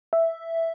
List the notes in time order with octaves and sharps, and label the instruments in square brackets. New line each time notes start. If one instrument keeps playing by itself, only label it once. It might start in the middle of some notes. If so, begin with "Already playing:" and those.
[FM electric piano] E5